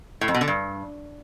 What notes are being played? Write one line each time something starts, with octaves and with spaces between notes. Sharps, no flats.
A2
F2
B2
D3
G2